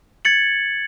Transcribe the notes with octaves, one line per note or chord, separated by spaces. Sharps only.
G#6 A6 C#7 F#7